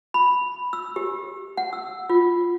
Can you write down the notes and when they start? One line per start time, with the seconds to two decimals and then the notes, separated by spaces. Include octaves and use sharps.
0.14 B5
0.73 E6
0.96 G4
1.57 F#5
1.73 E6
2.10 F4